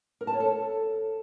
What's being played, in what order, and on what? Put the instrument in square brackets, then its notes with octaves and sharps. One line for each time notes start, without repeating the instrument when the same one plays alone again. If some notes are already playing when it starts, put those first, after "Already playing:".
[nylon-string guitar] A#4
A5
C#5
A4